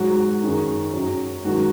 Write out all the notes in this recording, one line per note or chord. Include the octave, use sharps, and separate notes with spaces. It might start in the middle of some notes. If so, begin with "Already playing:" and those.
Already playing: G#2 F#3 F#4
F#2 D#3 G#3
F#2 F#3
G#2 D#3 F#3 F#4